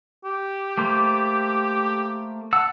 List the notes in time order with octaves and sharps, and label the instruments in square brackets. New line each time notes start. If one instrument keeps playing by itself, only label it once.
[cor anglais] G4
[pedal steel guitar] A3 A#3 C5
F#5 A5 E6